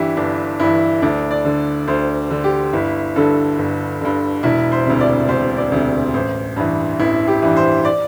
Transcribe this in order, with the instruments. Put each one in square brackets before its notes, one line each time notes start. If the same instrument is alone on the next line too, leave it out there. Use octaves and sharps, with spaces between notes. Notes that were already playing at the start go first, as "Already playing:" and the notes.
Already playing: [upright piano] G1 G2 E3 E4 G4
G1 D4
G2 E3 E4
D2 D4
D5
D3
D2 C5
D3
G4
G1 E4
G2 D3 A4
G1
G2 D3
E1 E4
C5
D2 C3
D5
E1 C5
D5
D2 C3
A1 C5
G2 E3
A1 E4
G4
G2 E3
C5
D5